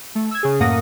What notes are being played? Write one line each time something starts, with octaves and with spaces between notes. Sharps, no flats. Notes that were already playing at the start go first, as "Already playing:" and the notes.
A3
E6 G#6
C#3 G#4
F#2 A2 A#3 F#5 D#6 A#6